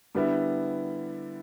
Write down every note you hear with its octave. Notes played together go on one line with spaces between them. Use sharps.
D3 G3 B3 E4